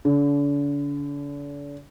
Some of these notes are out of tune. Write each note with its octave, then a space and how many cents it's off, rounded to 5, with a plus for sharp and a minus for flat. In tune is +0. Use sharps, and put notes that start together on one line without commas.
D3 -40